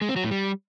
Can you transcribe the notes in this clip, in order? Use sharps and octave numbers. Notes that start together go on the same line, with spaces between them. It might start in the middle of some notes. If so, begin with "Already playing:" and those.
G#3
C4
F#3
A2
G3